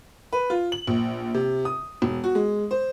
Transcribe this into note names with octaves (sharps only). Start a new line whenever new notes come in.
B4
F4
F#7
A#1
C3
D#6
E1
F#4
G#3
C5